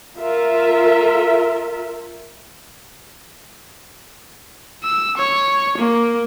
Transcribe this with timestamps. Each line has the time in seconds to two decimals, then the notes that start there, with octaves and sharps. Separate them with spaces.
0.18 F4 A#4 E5
4.83 E6
5.18 C#5
5.78 A#3